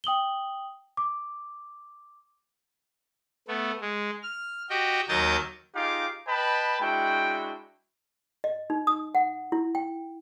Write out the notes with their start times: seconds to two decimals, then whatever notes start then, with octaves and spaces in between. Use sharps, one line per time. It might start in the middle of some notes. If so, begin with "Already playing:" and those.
0.04 G5 D#6 F#7 G7
0.97 D6
3.48 A3 B3
3.81 G#3
4.23 F6
4.70 F#4 G4 D#5 G5
5.09 D#2 F#3 A#4 D#5 G6 A6
5.75 D#4 F4 G4 G#4 F5 D6
6.27 B4 D#5 G5 A5 B5
6.81 G#3 D4 E4 F#4 G5
8.44 D#5
8.70 D#4
8.87 D#6
9.15 F#5
9.52 E4
9.75 G5